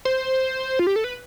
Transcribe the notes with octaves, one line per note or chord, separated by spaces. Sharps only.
C5
F4
G4
A4
B4